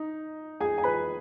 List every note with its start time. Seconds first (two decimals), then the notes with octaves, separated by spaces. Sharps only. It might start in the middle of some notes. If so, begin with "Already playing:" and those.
Already playing: D#4
0.60 G#4 G#5
0.78 G#5
0.84 B4 B5